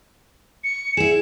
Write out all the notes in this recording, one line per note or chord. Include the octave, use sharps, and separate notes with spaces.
C#7
E4 G#4 E7